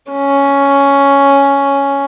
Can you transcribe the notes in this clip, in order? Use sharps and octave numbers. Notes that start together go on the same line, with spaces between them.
C#4